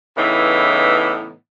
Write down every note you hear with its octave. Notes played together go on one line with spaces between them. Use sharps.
A2 C#3 E3 B3 D#4